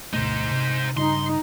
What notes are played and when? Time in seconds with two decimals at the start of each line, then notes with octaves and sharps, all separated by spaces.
0.13 D2 B2 A3 D#4 C5
0.51 C3
0.97 G2 C#3 D#4 C6